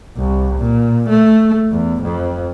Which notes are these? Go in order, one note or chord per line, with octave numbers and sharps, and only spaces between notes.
C2
A#2
A3
E2
F2